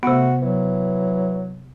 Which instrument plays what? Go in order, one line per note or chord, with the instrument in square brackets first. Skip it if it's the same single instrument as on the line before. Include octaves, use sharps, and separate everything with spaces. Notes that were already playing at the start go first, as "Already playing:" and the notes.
[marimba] C3 B3 [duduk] A3 [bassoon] F#4
[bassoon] E3 [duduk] F#3